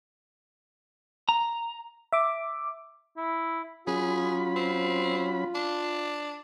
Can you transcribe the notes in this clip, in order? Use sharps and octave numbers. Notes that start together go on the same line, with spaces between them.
A#5
E5 D6
E4
F#3 C#4 F4 G#4 B5
C4
D4